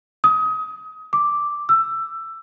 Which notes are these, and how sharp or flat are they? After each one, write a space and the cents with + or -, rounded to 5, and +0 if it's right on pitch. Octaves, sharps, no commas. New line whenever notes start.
D#6 +25
D6 +0
E6 +15